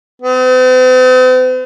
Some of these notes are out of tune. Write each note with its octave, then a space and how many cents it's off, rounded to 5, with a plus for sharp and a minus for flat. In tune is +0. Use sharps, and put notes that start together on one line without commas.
C4 -45